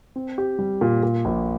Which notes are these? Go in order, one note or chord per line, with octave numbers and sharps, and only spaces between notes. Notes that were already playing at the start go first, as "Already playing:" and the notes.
C4
G4
G3
A#2
A#2
A#1